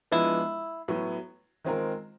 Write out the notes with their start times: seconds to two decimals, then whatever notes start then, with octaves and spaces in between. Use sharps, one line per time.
0.12 F3 G#3 B3 D4 E4
0.88 A2 F#3 B3
1.64 D#3 G#3 C4 F4 A#4